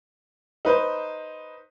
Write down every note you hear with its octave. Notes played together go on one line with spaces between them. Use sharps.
D#4 B4 C5